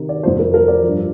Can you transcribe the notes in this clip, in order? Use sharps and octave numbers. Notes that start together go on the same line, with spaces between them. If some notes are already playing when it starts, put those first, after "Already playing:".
Already playing: C3 D#3
D5
F2 C3 F3 C5
A#4
A#4
D5
G2 F3